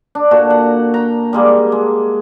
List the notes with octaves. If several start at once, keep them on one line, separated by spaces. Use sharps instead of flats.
D4
A#2 F#4 A4
F#5
G5 A#5
G3 G#3 A#3
G#3